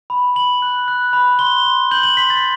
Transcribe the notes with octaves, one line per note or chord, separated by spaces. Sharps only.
B5
B5 F#7
F#6
F#6
B5
C6 G7
C6
G6 F#7
F#7
C6 B6
A6